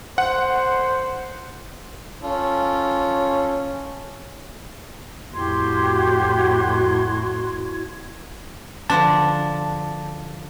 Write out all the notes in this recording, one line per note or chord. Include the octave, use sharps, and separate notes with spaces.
C5 F#5
C#4 F4 A4
F2 A2 E4 F#4 G4 C6 G#6
D3 F3 D4 A5